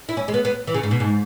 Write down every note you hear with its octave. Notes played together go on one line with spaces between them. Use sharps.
E4
C#4
G#3
B3
B3
E3
C#3
G#2
B2
G#2